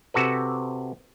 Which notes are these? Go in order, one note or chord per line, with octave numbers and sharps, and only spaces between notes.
C3 F#4 A4 B4